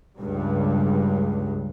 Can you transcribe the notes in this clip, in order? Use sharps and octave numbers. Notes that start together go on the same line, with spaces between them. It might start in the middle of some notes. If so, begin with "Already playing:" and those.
C#2 G2